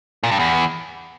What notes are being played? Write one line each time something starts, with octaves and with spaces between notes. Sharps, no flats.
A#2
G2
E2